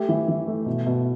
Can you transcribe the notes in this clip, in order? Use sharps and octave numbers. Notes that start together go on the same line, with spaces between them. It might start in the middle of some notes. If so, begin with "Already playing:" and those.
Already playing: A3 G4
E3
E3
A3
B2
B2